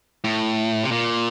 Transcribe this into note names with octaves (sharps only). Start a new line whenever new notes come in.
A2
C3
A#2